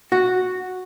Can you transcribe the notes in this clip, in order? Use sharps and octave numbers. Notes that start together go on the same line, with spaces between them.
F#4